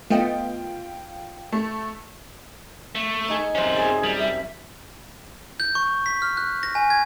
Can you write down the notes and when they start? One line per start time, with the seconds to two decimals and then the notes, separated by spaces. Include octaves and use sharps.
0.10 A3 B3 F4 D#5 G5
1.52 A3
2.95 A3
3.28 D#4 G#4
3.55 F#2 C3 C#4 C5
3.76 G#4 D5
4.03 G3
4.19 E5
5.60 G6
5.75 C#6
6.06 B6
6.22 F6
6.37 F#6
6.63 A#6
6.75 G#5
6.90 G#6